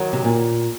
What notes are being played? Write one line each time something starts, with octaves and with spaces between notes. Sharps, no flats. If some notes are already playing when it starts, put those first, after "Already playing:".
Already playing: D#3 F#3
C3
A#2